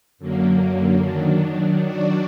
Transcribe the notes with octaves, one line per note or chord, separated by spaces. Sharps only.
F#2 D3 F#3 A#3
D#3 F#3 D4
D#3 F#3 D4 F#4 D5